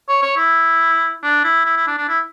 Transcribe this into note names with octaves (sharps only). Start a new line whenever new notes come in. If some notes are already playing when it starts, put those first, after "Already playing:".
C#5
C#5
E4
D4
E4
E4
E4
D4
D4
E4